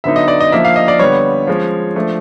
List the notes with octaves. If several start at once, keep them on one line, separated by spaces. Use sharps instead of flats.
D3 F#3 B3 D#4 E5
D#5
D5
D#5
F3 A#3 D4 E5
F5
D#5
D5
D3 G3 B3 C#5
F3 G#3 C#4
F3 A3 D4